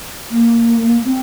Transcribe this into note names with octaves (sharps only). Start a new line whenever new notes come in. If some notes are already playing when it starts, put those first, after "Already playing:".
A#3
C4